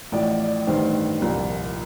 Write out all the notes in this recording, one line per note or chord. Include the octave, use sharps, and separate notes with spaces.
A1 A2 F3 D5
D5
A1 G2 D#3 C5
C2 A#2 F3